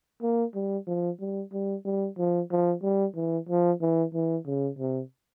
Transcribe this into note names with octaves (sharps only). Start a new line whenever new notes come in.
A#3
G3
F3
G3
G3
G3
F3
F3
G3
E3
F3
E3
E3
C#3
C3